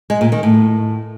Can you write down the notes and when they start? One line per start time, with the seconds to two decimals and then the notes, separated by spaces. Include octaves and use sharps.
0.10 G#3
0.21 A#2
0.32 D#3
0.43 A2